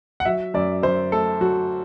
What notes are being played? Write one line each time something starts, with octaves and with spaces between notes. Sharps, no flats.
F#5
F#3 E5
F#2 D5
F#2 C5
A3 A4
F#3 F#4